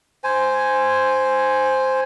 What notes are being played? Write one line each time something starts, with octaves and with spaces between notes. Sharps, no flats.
C5 G#5